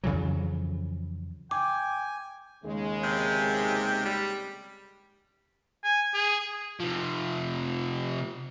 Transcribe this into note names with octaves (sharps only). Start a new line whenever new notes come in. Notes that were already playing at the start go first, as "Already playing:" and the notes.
F2 C#3 E3 F#3
G5 G#5 D6
D#2 C#3 G#3
C3
G3
G#5
G#4
C3 F3